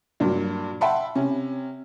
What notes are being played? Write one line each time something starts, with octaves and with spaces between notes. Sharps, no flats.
G2 A#2 F#3
E5 F#5 G5 A5 B5 C6
C3 C#4